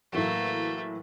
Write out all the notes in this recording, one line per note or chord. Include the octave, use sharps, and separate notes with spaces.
A2 E3 F#3 A3 A#3